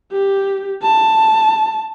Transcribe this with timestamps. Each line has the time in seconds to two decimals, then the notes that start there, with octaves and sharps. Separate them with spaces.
0.12 G4
0.83 A5